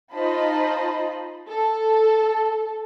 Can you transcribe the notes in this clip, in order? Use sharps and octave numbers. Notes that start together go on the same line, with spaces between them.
D#4 F4 C5 D#5 A5 B5
A4